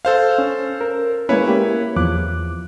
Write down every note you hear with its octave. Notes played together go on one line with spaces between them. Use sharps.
A4 C5 F5
C#4
A#4
G#3 A#3 C#4 E4 B4 C#5
A#3 G4
E2 F3 D6 F#6